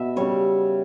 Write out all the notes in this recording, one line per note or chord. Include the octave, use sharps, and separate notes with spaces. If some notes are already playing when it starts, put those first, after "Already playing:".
Already playing: B2 E5
C#3 G3 C#5